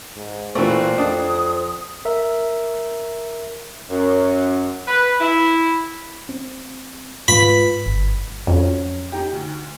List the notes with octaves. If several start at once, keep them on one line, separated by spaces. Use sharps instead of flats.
G#2
A#2 E3 A3 C4 F#4
F2 D4 D#6
A#4 E5
F#2
B4
E4
C4
G#2 F4 B4 B5
G1
F2 F#3 C#4
D#4 G4
D2